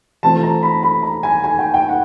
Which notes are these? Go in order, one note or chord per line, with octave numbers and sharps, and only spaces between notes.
E3 A3 C4 F4 A5
A#5
B5
B5
A#5
G#5
G#5
G5
G5
F#5